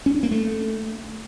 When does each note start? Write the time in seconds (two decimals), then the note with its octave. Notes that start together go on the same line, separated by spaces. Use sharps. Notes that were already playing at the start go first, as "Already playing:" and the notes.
0.06 C#4
0.15 D4
0.23 A#3
0.31 A3